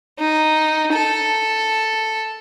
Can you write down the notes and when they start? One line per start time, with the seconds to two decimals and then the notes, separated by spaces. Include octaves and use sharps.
0.19 D#4
0.93 A4